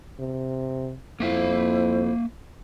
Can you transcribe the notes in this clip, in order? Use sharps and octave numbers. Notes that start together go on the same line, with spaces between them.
C3
F2 A#3 E4 C5 E5 F5